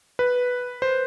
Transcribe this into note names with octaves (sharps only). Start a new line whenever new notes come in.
B4
C5